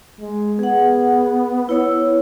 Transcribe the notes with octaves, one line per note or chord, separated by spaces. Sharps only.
G#3
B3 G#4 F#5
B3 E4 C#5 E6